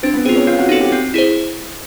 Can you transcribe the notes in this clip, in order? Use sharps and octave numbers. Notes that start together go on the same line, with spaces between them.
C4 D4
B3
C4 F4 G#4
C#4
C4 F4
F#4
D#4 F#4 A4
G4
C4
E4 G#4 C5